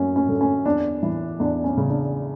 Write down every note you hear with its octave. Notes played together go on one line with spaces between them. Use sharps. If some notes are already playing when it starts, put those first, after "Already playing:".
Already playing: F#2 F#3 C#4
C#4
D3
C#4
E2 D4
E3
E2 D4
C#4
C#3
D4